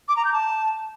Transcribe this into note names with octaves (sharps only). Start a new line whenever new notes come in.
D6
A#5
G6
A5